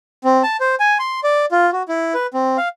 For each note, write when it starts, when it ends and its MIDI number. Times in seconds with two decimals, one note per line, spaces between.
0.24 0.43 60
0.43 0.57 81
0.60 0.75 72
0.80 0.98 80
0.99 1.20 84
1.24 1.46 74
1.52 1.70 65
1.73 1.83 66
1.88 2.14 64
2.14 2.27 71
2.34 2.57 60
2.57 2.69 77